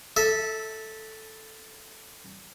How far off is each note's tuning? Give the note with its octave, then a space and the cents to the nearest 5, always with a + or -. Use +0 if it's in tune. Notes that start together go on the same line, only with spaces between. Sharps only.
A4 +0 E5 -20